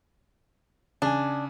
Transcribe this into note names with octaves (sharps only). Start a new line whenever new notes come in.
C#3 D4 G#5